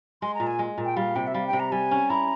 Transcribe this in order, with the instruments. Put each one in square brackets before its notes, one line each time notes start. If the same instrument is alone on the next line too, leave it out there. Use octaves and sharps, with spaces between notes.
[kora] G#3 [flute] C6
[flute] A#5
[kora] A#2
[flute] G#5
[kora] G#3
A#2
[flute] G5
[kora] G3 [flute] F5
[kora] C3 [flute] G5
[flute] E5
[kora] G3 [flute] F5
[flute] G5
[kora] C3
[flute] A#5
[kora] G3 [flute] G#5
[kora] C#4
[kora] E4 [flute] A#5